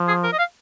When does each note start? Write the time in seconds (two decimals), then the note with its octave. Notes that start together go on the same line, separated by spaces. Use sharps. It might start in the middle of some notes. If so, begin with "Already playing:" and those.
Already playing: F3
0.08 G#4
0.23 A#4
0.33 D#5
0.38 F5